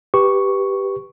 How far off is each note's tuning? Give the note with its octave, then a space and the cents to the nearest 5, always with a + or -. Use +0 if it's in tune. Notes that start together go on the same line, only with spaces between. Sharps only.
G4 +0 B4 +0 C#6 +0